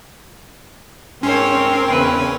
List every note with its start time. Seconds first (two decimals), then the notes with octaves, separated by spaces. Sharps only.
1.23 G#2 C4 C#4 A#4 C5 C#5
1.89 E2 C#3 B4